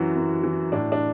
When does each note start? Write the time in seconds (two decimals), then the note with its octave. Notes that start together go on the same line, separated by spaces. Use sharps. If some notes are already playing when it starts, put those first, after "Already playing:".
Already playing: F#2 E3 F#3 F#4
0.16 F#2
0.43 E3
0.72 A2 D4
0.92 D4